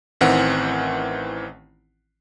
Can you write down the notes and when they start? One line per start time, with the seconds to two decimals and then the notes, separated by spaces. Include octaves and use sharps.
0.21 A1 D#3 E3 C4 F#5